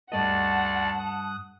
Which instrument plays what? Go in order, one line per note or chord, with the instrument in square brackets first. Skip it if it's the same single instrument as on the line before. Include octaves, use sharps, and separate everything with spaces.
[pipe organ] D2 D5 [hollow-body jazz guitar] G2 A3 D#5 [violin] F#5 [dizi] A5
[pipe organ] D#6 F#6